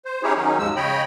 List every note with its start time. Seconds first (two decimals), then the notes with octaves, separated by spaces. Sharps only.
0.05 C5
0.23 C#4 D#4 E4 G4 G#4 C#5
0.36 D#3 F#3 C#4 D#4
0.59 D#2 G#2 F3 G#3 E6
0.76 C#3 C#5 D#5 G5 B5